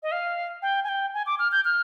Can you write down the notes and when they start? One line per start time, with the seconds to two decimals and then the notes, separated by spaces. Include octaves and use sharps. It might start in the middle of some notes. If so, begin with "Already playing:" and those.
0.03 D#5
0.12 F5
0.62 G5
0.84 G#5
0.89 G5
1.14 G#5
1.26 D6
1.39 F6
1.52 G6
1.65 F6